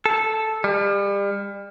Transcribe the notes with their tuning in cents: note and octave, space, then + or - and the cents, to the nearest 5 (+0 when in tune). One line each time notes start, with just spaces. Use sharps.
A4 -5
G3 +35